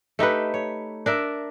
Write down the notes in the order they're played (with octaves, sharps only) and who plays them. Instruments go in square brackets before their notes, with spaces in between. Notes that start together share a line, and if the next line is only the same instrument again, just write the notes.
[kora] A3 D#4 G4 B4
C#5
D4 A#4 E5